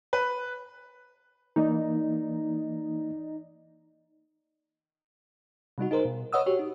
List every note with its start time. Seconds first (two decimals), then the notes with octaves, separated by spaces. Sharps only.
0.13 B4
1.56 E3 A#3 D#4 D5 D#5
5.78 C3 G3 D#4 F#4
5.91 D#4 G#4 A#4 C5
6.05 B2
6.33 B4 C#5 D#5 F#5 D#6 E6
6.46 F#4 G4 C#5
6.59 D#4